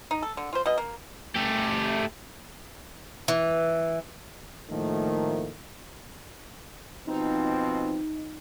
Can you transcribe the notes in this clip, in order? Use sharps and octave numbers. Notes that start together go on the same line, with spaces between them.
D#4
A4
D3
F4 C5
B2 D#5
A#3
A3 G4
E3
A2 D#3 F3 A3 A#3
B2 F3 C4 D#4